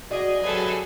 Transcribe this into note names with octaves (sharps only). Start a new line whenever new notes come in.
F#4 G#4 D5 D#5
C3 F#3 G#3 G#4 A4 B4